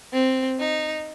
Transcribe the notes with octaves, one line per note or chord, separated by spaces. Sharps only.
C4
D#4